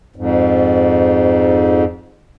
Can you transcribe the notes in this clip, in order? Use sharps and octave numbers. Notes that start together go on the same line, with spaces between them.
F2 G#2